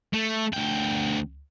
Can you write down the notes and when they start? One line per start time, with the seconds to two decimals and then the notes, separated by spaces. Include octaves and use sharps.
0.13 A3
0.53 D2 G5